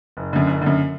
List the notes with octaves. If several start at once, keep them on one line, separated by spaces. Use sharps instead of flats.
F#1
F#2 D3
F#1
F#2 D3